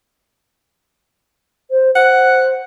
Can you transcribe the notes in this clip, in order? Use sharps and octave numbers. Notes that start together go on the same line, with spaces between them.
C5
C5 F#5